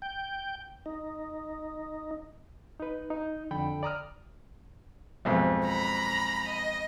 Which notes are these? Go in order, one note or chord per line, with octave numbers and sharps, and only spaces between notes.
G5
D#4
D#4 B4
D#4
F2 D3 A4 G5 B5
D5 A#5 D#6 F6
B1 F2 G#2
A#5 B5
D#5